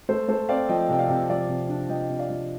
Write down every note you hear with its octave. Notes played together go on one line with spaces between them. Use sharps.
A3 A4 C5
A3 A4 C5
C4 D5 F5
F3 D#5 G5
C3 G5
D5 F5
C3
F3 D5 F5
C3
D4
F3 D#5 G5
C3
D5 F5
F3